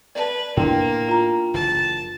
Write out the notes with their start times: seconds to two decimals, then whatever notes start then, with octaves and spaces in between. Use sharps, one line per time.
0.15 B4 D5 A5
0.57 A2 A#3 B3 D4 E4 G5 C6
1.09 F4 A#5
1.54 F#1 E3 A5